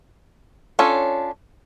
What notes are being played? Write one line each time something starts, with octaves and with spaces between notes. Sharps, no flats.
C#4 D4 F4 A4 C#5